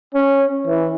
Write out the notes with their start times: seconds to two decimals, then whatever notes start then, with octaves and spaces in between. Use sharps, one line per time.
0.15 C#4
0.67 E3